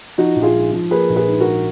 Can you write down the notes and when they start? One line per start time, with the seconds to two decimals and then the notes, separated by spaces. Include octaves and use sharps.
0.18 F3 D#4 F#4
0.36 A#1
0.43 F4 G#4
0.55 G#2
0.73 F3
0.91 A#3 G#4 B4
1.10 A#1
1.16 G#4 B4
1.28 G#2
1.40 F#4 A#4
1.46 A#1